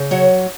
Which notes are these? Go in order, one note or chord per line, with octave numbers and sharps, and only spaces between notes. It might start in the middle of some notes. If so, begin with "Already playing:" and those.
Already playing: C#3
F#3 C#5